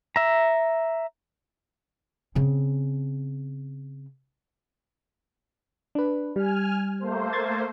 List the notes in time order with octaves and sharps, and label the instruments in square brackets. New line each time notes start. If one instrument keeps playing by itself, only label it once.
[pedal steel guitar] E5 A#5
[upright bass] C#3 C4
[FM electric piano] D4 B4
[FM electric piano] G3 [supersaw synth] G#5 F6
[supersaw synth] A3 A#3 C5
[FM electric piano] C6 G#6 A6